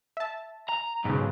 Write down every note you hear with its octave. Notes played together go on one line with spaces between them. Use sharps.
E5 A5
A#5
B1 G#2 C#3